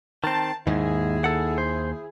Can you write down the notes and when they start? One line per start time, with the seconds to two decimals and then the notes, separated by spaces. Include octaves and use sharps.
0.24 D#3 C4 A5
0.67 D#2 G#2 D#3 E4 G#4
1.24 A4 F#5
1.58 C5